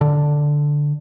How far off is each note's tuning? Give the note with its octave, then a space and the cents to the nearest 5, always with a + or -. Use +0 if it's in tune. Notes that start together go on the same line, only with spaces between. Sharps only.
D3 +0